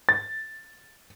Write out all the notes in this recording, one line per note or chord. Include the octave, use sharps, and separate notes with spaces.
A6